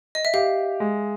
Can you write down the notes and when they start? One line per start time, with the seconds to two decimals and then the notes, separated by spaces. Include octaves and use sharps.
0.15 D#5
0.25 E5
0.34 G4 F5
0.80 G#3